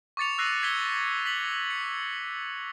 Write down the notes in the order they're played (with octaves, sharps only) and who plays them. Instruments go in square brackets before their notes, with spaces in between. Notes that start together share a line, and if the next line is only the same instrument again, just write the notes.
[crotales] C#6 D6 A6 C#7 F7
E6 F#6 A#6 C7 D#7
G#6 B6 C#7 G7
B6 F#7
C#7